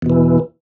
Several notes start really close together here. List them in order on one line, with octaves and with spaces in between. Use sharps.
E2 B2 E3